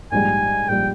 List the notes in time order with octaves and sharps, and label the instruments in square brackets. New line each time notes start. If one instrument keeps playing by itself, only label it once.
[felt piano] A#1 G#2 G3 [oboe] G#5
[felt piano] A#1 G3 [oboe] G5